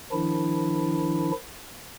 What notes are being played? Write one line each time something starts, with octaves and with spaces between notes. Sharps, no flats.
D#3 F3 D4 E4